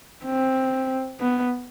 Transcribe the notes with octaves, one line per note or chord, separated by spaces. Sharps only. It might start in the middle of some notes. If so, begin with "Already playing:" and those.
C4
B3